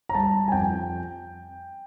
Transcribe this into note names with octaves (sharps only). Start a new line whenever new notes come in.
A#5
G3 A5
G#5
F2 G5